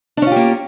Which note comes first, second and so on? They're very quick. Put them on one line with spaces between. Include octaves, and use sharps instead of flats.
D4 C#4 F4 G4 A#3